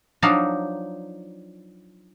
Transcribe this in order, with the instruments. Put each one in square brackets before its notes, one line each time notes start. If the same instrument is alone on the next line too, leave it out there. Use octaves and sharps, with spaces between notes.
[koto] F3 F#3 D4 D#4 F5